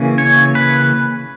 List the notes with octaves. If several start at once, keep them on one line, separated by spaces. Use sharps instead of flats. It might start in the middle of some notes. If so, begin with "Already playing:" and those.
Already playing: C#3 E3 A#3 C#4
C#5
B4